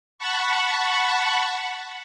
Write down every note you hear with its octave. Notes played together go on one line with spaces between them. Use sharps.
F#5 A5 B5 C#6